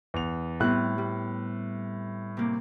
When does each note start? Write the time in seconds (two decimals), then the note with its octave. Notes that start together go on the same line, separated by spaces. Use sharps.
0.14 E2 F7
0.60 A2 G3 B3 C4 F#6
0.98 G3
2.37 C3 A#3